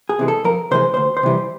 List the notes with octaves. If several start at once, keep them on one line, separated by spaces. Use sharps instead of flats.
G#4
C3 E3 G#3
A4
F2 A#4
C3 E3 G#3 C5
D2 C5
C5
C3 E3 G3